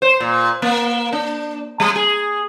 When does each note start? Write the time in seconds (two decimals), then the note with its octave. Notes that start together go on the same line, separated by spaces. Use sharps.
0.02 C5
0.20 A#2
0.62 A#3
1.13 D4
1.80 G3
1.96 G#4